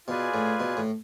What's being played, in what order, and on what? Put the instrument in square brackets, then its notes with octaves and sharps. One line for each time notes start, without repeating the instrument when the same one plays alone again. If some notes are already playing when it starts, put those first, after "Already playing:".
[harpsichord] B2 [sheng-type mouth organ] F4 G#4 B4 D5 G#5
[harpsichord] A2
B2
A2